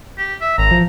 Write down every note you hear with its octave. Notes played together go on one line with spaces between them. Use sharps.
G4
E5
G#1 A#5
F3